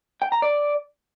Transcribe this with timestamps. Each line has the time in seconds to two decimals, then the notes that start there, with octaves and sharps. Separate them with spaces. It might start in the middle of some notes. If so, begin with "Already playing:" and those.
0.22 G5
0.32 A#5
0.42 D5